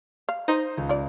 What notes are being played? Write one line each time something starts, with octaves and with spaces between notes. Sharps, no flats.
F5
D#4 C5
C#2
F4 D5